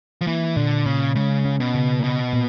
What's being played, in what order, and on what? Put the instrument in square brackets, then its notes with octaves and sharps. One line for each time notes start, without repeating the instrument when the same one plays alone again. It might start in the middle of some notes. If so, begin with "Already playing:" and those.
[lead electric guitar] F3
[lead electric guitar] E3 [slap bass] A#3
[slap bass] A#2 [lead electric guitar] D3
[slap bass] A#2 [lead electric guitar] C#3
[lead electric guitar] C#3 [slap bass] G#3
[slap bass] C#4
[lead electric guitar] B2
[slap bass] C#3
[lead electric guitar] A#2
[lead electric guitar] B2 [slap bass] B3
[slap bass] A#2